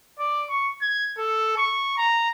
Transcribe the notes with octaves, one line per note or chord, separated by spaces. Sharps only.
D5
C#6
G#6
A4
C#6
A#5